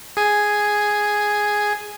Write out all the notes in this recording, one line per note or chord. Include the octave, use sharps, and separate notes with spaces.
G#4 G#5